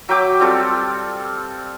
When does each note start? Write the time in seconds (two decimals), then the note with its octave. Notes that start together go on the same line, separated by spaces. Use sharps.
0.09 F#3 E5 G5 D6
0.40 G3 C4 F4 A4